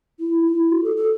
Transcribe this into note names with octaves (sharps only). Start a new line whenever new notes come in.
E4
E4
F#4
A4
A4